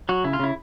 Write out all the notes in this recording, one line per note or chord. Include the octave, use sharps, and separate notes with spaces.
F#3 F#4
C#3 E4
F4
C#3 E4